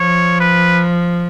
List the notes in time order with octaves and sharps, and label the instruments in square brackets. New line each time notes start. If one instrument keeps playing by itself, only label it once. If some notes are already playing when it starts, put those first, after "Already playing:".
Already playing: [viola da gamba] F3 [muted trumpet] C#5
[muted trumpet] B4